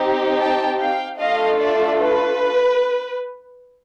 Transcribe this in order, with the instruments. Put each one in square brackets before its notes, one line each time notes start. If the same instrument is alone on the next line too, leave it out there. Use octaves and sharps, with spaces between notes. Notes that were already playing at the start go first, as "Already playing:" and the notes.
Already playing: [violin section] C4 D#4 G4
G5 A5
F5 G5
A3 D4 F4 A4 D#5 F5
D5 E5
B4